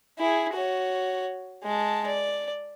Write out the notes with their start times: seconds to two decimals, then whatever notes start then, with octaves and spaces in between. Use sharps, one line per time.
0.19 E4 G#4
0.53 F#4 C#5
1.64 G#3 A5
2.06 D5